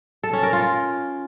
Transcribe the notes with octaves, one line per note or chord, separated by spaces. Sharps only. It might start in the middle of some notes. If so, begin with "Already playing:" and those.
A4
C#4
A#4
F4